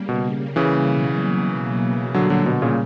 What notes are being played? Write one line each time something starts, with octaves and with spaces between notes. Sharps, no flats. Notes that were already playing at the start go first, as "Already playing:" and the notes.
Already playing: C#3 G3 A#3
B2
C#3 E3
B2 F#3 A#3
A#2 D3 F#3 G3 A#3
D3 F#3
B2 D3
A#2 C#3